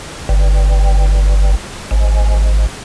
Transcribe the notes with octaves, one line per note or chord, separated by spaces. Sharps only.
G1
G#1